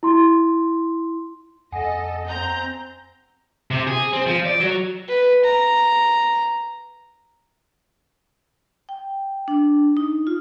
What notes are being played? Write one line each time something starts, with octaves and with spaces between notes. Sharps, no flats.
E4 C6
F2 A4 D#5 F#5 G#5
C4 A#5 G6
C3
G#4
C4
F3
D5
F#3
B4
A#5
G5
D4
D#4
F4